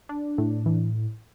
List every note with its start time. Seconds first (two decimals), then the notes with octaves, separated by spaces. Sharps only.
0.09 D4
0.38 A2
0.66 E3